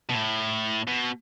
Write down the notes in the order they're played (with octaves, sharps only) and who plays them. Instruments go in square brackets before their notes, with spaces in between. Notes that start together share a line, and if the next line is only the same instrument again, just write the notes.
[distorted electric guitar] B2
A2
B2